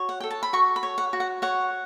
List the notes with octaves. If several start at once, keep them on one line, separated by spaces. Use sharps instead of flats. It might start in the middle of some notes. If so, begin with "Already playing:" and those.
Already playing: F#4 C#5
F#5
A4 G5
A5
B5
F#4 C#6
B5
C#5
F#5
F#4
F#5
C#5 F#5